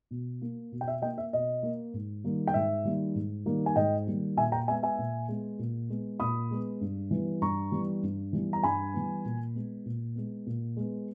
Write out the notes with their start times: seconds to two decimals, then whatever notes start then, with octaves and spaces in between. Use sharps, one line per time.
0.11 B2
0.42 A#3
0.72 B2
0.81 G5
0.88 E5
1.02 A#3 D#5 G5
1.18 E5
1.33 B2 D#5
1.63 A#3
1.93 G#2
2.24 D#3 G3 A#3
2.47 G5
2.54 G#2 E5
2.84 D#3 G3 A#3
3.15 G#2
3.46 D#3 G3 A#3
3.66 G#5
3.76 G#2 D#5 G5
4.07 D#3 G3 A#3
4.37 A#2 E5 G#5
4.52 G5 A#5
4.68 G#3 B3 E5 G#5
4.83 E5 G#5
4.98 A#2
5.28 G#3 B3
5.59 A#2
5.90 G#3 B3
6.19 A#2 B5 D#6
6.51 G#3 B3
6.81 G2
7.11 E3 G3 B3
7.41 G2 A#5 C#6
7.72 E3 G3 B3
8.03 G2
8.33 E3 G3 B3
8.53 A#5
8.63 G2 G#5 B5
8.94 E3 G3 B3
9.25 A#2
9.55 G#3 B3
9.86 A#2
10.15 G#3 B3
10.46 A#2
10.77 G#3 B3